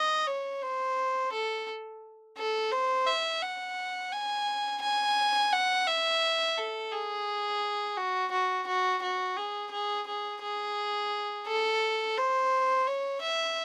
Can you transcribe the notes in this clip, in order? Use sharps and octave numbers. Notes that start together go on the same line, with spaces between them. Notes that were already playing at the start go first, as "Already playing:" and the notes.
Already playing: D#5
C#5
C5
A4
A4
C5
E5
F#5
G#5
G#5
F#5
E5
A4
G#4
F#4
F#4
F#4
F#4
G#4
G#4
G#4
G#4
A4
C5
C#5
E5